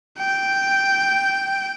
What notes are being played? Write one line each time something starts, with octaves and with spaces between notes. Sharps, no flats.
G5